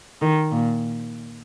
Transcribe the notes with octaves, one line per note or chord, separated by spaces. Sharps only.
D#3
A#2